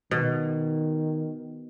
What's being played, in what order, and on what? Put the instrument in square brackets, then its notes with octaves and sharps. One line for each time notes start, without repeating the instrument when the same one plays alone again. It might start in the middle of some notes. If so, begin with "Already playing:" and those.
[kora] B2 [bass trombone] D#3